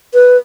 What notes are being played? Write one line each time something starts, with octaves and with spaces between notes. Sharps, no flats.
B4